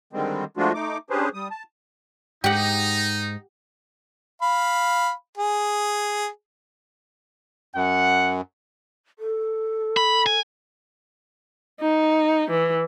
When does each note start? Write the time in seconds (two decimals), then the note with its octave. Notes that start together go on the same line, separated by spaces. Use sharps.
0.13 D3 D#3 G3 G#3 C4
0.57 F3 G#3 A3 D4 F4 F#4
0.74 A3 D#4 D6
1.10 C#4 D4 G4 G#4 B4 C5
1.34 G3 D#6
1.50 A5
2.44 G#2 D#4 G4 F#5
4.42 F5 B5
5.38 G#4
7.75 F#2 F#5
9.19 A4
9.97 B5
10.26 G#5
11.81 D#4
12.51 E3